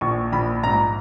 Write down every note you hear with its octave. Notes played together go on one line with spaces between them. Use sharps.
A#1 C#6
A#1 B5
G#2 A#5